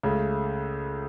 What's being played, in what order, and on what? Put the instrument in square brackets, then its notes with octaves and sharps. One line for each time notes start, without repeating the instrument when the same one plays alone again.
[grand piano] C#2 C#3 A3